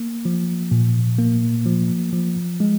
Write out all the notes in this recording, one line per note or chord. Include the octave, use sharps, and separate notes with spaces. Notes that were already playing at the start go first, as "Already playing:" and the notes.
Already playing: A#3
F3
A#2
A#3
F3
F3
G#3